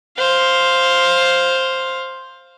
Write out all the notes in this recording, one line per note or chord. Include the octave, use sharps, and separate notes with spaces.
C5 F5